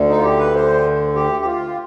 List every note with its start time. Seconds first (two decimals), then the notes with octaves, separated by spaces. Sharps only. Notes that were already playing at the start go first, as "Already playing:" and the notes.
Already playing: D2 D3
0.09 D#4
0.18 F4
0.23 G4
0.39 B4
0.54 C5
1.15 G4
1.41 G4
1.46 F4